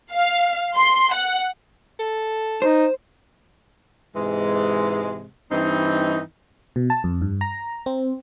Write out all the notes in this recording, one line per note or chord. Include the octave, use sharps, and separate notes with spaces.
F5
C6
F#5
A4
D#4 C5
G#2 C3 E3 G#3
G2 E3 C4 D#4
B2
A5
F2
G2
A#5
C4